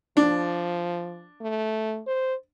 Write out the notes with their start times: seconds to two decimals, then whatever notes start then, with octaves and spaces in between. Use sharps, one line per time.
0.17 F3 D4
1.41 A3
2.07 C5